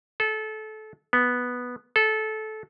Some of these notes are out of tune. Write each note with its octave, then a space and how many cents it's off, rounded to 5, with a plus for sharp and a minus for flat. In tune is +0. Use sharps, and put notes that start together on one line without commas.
A4 -25
B3 -5
A4 -20